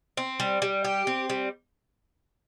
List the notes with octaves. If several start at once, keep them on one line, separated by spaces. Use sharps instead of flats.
C4
G3
G3
G4
C4
G3